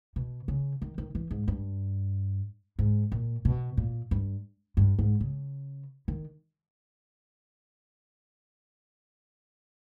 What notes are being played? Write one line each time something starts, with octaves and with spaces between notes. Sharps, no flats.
B2
C#3
D#3
D#3
E3
G#2
G2
G#2
A#2
B2
A#2
G2
G2
G#2
C#3
D#3